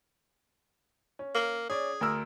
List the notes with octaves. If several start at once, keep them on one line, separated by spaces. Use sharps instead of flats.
C#4
A#3
C#4 G#4 D5
D2 A#4 E6